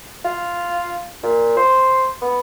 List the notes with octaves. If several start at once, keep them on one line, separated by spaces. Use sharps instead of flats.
F4
A#2
C5
B3